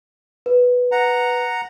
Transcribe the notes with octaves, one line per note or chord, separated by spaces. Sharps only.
B4
F#5 A#5